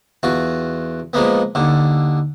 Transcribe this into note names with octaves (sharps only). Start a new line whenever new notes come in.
E2 F4 F#4
F3 G#3 A#3 B3
D#2 D3